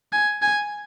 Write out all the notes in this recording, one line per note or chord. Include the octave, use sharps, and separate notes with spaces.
G#5
G#5